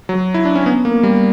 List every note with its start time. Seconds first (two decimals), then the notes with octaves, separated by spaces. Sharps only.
0.09 F#3
0.34 E4
0.45 D4
0.55 C#4
0.66 B3
0.85 A#3
1.03 G3